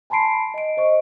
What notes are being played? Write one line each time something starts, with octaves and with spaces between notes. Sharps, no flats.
G#5 A5 B5 C6 C7 D7
D#5 D7
C5 D#5 C#6